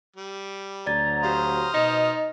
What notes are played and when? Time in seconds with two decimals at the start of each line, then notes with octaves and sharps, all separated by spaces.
0.16 G3
0.86 D2 F#3 D5 A#5 G#6 A6
1.23 F#4 G4 C5 F5 D#6 F6
1.74 B2 D#4 D#5